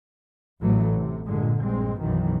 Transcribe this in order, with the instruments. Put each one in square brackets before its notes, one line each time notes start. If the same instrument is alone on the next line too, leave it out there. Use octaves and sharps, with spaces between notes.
[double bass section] A1 A2 E3 F#3 A3
C3
G2 A#2 D3 G#3
A#1 G2 G#3 C4
B1 F#2 D#3 E3